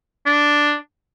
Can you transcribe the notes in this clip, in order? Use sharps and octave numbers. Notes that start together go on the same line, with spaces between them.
D4